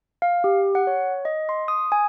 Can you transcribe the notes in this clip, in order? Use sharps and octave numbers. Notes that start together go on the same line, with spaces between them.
F5
G4
F#5
C#5
D#5
C6
D#6
G#5